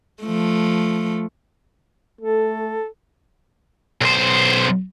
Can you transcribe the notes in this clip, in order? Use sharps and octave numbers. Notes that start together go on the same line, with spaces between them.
F3 A3
A3 A4
B1 C5